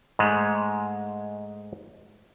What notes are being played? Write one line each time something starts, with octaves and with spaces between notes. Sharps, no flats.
G#2 G#3 A3